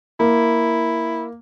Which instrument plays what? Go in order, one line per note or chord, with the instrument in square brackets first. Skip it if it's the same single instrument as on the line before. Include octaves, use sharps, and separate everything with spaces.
[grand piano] A#3 [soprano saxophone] E4